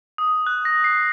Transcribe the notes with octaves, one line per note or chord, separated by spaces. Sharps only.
D#6
F#6
A#6
C7